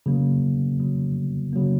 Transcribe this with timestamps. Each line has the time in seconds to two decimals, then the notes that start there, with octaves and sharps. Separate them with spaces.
0.06 C#3 F#3 A#3
0.80 C#3 F#3 A#3
1.53 C#3 F#3 A#3